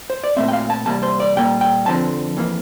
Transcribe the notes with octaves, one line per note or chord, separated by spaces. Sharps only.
C5
D5
A#2 A3 C4 E5
G5
F5
A5
E2 C3 G3 A#3 A5
C5
D5
A#2 G3 A#3 G5
G5
F2 D3 F3 C4 A5
F2 E3 A#3